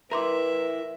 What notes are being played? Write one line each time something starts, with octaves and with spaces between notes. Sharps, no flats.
E4 A#4 B4 E5 A#5 C6 D6